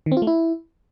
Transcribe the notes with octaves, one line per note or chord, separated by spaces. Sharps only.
D#3
C4
F4
A3
E4